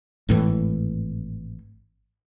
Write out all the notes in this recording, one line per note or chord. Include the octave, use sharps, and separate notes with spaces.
G#1 A2 E3